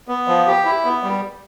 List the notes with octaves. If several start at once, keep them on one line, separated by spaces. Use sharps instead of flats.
B3
F3
G4
E4
B3
G3